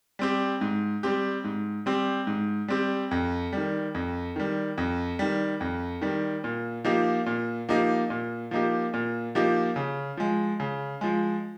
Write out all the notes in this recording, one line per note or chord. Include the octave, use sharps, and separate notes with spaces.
G3 C4 G4
G#2
G3 C4 G4
G#2
G3 C4 G4
G#2
G3 C4 G4
F2
D#3 G3
F2
D#3 G3
F2
D#3 G3
F2
D#3 G3
A#2
F3 A#3 D#4 G4
A#2
F3 A#3 D#4 G4
A#2
F3 A#3 D#4 G4
A#2
F3 A#3 D#4 G4
C#3
F3 G#3
C#3
F3 G#3